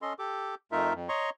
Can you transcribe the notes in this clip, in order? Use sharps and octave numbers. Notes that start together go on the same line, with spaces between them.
C#4 A4 D#5 C6
G4 A4 D6
F2 A3 D#4 F4 A#4 E5
F2
C#5 D#5 A#5 C6 C#6